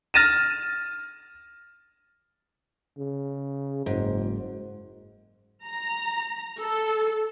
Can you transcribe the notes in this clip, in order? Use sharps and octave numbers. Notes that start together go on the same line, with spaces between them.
F6 A6 A#6 D#7 E7
C#3
F#1 G#2
A#5
A4